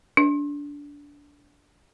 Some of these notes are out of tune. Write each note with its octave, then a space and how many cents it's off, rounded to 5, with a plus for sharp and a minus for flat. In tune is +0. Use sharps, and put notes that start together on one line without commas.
D4 -20